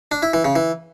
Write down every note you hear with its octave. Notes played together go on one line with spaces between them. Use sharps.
D4
E4
E3
C#3
E3